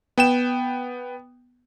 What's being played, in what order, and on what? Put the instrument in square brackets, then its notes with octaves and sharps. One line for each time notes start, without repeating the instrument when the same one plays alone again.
[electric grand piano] B3 G5 E7